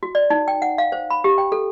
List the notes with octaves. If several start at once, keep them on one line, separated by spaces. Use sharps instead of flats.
F#4
D5
D#4
G5
F#5
F5
C5
B5
G4
G5
A4